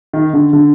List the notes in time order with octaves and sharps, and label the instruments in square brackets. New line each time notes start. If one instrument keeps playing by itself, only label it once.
[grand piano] D#3
D3
D3